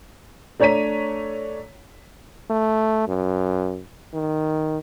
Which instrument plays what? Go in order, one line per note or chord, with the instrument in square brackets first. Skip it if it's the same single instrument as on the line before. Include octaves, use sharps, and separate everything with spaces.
[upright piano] A3 D4 C#5 A#5 B6 D#7
[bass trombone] A3
F#2
D#3